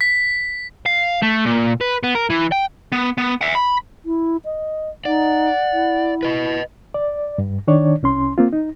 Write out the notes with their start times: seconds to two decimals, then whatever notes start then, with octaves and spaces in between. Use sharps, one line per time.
0.01 B6
0.86 F5
1.23 A3
1.46 A#2
1.81 B4
2.04 B3
2.15 A#4
2.30 E3
2.52 G5
2.92 B3
3.18 B3
3.41 E5 F#5
3.55 B5
4.05 E4
4.45 D#5
5.05 D#4 D5 F#5
5.73 E4
6.23 B4 D#5
6.94 D5
7.38 G2
7.67 D#3 D4 C#5 D5
8.03 C2 C#4 C6
8.38 A#3 C4 F4
8.53 D#4